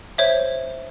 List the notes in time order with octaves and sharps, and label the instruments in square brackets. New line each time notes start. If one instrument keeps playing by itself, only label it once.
[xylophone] C5 C#5 E5